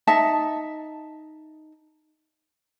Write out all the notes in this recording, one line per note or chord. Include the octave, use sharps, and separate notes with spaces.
D#4 E5 A5